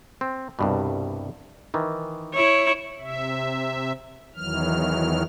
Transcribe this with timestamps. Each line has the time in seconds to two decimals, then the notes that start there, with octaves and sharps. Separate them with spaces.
0.21 C4
0.59 C2 G2 B2
1.74 D#3 E3
2.35 E4 C#5
3.00 C3 E5
4.35 E2 D#3 E3 F#3 F6